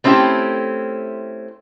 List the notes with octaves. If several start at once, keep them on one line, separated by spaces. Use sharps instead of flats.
A3 C4 C#4 E4 G4